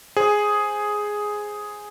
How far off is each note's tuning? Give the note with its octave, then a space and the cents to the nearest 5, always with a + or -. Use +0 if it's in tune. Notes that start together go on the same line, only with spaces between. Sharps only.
G#4 +0 C5 +0